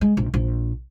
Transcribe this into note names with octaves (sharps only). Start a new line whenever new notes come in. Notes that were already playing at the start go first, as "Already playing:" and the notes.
G#3
A#1
A#1